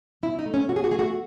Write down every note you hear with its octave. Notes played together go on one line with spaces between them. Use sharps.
B2 E4
D#4
A3
C#4
B2 F#4
G#4
F#4
A3 G#4
F#4